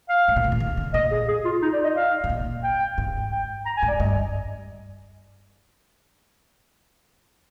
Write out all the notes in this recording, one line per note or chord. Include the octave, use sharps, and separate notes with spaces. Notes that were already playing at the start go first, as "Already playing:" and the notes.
F5
G#2
A#2
C3
D3
D#3
D3
A#2 D#5
G#4
G#4
F4
D#4
D5
D#5
F5
G#2
A#2
G5
G#2
G5
A#5
G#5
G#2
D5
G2 D#5